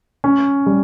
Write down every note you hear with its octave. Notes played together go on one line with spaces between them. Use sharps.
C#4
G3